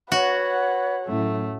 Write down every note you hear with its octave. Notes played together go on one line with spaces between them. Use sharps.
F#4 B4 C#5 F#5
F#2 A2 A3